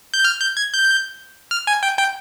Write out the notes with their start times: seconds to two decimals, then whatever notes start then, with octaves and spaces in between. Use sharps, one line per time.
0.14 G6
0.25 F6
0.41 G6
0.57 G#6
0.73 G6
1.51 F6
1.67 G#5
1.83 G5
1.98 G5